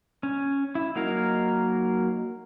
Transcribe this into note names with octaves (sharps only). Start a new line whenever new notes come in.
C#4
E4
F#3 A#3 D#4 A#4 F5